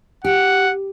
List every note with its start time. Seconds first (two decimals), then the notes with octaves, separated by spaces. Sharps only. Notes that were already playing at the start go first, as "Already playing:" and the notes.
0.24 G4 F#5